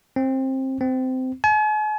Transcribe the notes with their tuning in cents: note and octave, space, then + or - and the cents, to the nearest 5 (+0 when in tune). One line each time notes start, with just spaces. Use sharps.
C4 +20
C4 -20
G#5 +45